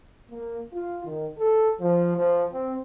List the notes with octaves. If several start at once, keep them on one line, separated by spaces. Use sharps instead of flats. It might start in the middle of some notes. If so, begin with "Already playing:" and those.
A#3
F4
D#3
A4
F3
F3
C4